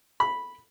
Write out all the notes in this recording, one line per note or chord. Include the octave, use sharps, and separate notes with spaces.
B5